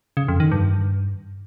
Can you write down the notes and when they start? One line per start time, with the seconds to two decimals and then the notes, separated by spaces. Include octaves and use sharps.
0.17 C#3
0.28 F2
0.40 D#3
0.52 G2